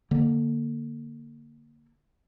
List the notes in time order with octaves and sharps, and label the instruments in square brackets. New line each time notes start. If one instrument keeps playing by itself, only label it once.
[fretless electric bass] D3 A#3